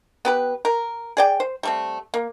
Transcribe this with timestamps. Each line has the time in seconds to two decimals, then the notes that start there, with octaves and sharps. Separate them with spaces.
0.25 B3 G4 B4
0.65 A#4
1.17 G#4 D5 G5
1.40 C5
1.63 G3 A3 C4
2.14 A#3